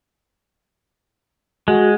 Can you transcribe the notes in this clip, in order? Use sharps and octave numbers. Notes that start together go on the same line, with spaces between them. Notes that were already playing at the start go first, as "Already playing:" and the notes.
G#3 F#4